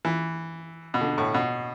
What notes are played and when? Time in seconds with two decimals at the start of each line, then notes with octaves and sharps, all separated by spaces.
0.05 E3
0.94 B2
1.01 D3
1.18 A2
1.34 B2